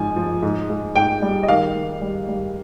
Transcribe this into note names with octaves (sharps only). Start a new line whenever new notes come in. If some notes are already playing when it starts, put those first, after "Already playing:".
Already playing: G#2 F3 G#5
F3
G#2
G#2
G#2 G5
G3
D#5
D#3 F5
D#3
G3
G3